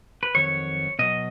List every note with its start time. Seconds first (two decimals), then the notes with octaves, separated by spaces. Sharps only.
0.23 B4
0.35 F2 D#3 F#3 C#5
0.99 B2 F#3 D#5